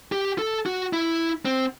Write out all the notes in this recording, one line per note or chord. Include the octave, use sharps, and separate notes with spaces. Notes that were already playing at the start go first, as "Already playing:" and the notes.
G4
A4
F#4
E4
C4